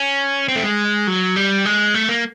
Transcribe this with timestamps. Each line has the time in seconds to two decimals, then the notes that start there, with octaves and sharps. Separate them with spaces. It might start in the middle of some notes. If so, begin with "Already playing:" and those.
Already playing: C#4
0.48 C4
0.56 A3
0.63 G#3
1.07 F#3
1.36 G3
1.65 G#3
1.94 A3
2.09 A#3